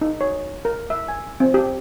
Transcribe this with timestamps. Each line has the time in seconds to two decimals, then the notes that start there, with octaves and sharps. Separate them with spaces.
0.01 D#4
0.21 C#5
0.65 A#4
0.90 E5
1.08 G#5
1.40 C4
1.54 G4